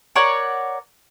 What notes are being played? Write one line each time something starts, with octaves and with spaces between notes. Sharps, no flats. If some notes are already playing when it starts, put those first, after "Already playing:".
A#4 C#5 D5 F#5